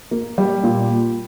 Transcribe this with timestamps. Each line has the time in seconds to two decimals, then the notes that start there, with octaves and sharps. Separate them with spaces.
0.11 A#3
0.38 G3
0.64 A#2